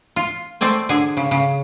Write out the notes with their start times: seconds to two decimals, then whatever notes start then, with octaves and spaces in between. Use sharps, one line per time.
0.16 F4
0.61 A3 C4 D5 G#5
0.89 D3 G#4
1.17 C#3
1.31 C#3